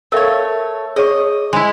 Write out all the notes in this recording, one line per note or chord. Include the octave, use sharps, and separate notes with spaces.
A3 A#4 C#5 E5 F5
G#4 C#5 D#5 C#6
G#3 E4